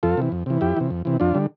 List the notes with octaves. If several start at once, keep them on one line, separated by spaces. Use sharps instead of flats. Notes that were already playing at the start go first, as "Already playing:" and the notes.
F2 F4 A4
C3 E3
F2
C3 E3
F2 E4 G4
C3 E3
F2
C3 E3
F2 D4 F4
D3 G3